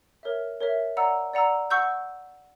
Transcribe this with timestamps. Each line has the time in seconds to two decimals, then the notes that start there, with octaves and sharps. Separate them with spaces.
0.23 A#4 C#5 E5
0.60 A#4 C#5 E5
0.97 D5 F#5 A#5 E6
1.33 D5 F#5 A#5 E6
1.70 F#5 C#6 E6 G6